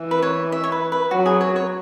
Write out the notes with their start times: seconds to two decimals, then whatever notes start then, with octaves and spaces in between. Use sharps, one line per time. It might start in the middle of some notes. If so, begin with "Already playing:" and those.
Already playing: E3
0.11 B4
0.22 C#5
0.52 E5
0.64 C#5
0.72 B4
0.92 B4
1.11 F#3 F#4
1.26 G#4
1.41 C#5
1.56 C#5